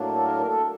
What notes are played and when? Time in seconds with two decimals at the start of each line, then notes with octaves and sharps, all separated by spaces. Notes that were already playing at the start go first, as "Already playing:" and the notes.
Already playing: A2 F#3 A#3 D4
0.15 A4
0.24 A#4
0.41 A#4
0.46 A4